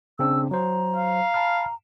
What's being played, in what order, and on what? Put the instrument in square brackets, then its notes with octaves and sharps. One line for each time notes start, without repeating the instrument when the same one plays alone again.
[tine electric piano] C#3 C4 D4 [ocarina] E6
[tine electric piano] F#3 C5 [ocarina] A#5
[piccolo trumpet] F5
[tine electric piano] A5 B5 F6